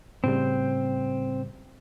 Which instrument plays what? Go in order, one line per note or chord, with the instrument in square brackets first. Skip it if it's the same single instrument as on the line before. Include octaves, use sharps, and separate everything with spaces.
[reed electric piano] A2 C#3 G3 [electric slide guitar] C4